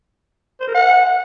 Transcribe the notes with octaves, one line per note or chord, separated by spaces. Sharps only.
C5
A#4
F#5